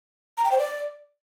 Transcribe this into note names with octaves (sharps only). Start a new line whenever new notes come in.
A#5
G5
C5
D5